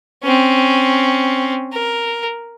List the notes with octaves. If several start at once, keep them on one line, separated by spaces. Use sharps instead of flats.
C4 C#4
A#4